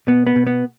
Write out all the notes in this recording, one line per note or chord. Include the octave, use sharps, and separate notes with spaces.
B2 B3
B3
B2
B3